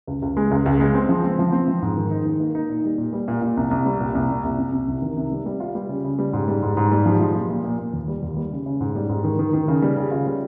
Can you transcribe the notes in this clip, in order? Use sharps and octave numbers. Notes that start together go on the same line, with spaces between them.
C#2
C#2
G#3
C#2
C#2
G#3
C4
F3
C4
F3
C4
F3
G#2
D#3
D#4
D#3
A#3
D#4
A#2
G3
A#2
G3
A#2
A#2
C2
C2
G3
A#2
C2
A#2
C2
C3
C3
C2
D#3
C3
G3
G3
F4
G3
C#3
C#3
G3
G#2
G3
G#2
G#2
G3
F3
F3
A#2
A#2
A#2
A#2
D#2
G3
D#2
G3
C#3
C#3
G#2
G3
G#2
D#3
D#3
D#3
C#3
G3
C#3
F4
G3